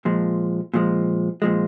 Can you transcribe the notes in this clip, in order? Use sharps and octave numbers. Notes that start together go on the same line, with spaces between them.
A#2 F3 G#3
A#2 F3 G#3
A#2 F3 G#3